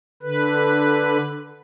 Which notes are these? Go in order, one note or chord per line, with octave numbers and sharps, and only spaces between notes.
D3 B4